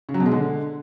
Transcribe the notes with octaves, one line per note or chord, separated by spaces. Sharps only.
C#3
F#3
B2
G#3
D3